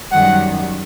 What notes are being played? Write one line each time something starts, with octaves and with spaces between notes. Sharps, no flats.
F#2 D#3 G3 F#5